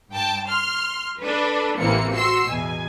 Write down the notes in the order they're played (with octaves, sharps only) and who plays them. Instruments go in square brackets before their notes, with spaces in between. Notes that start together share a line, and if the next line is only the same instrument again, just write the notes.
[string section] G2 G5 A5
C6 F6
D4 A4 B4
A1 C3 E3 A#3 C4 C#7
F#4 C6 E6 C7 C#7
E2 B2 G#5